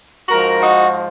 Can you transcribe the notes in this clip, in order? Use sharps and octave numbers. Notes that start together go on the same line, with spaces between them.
G#2 F3 F#4 A#4
D#4 F#4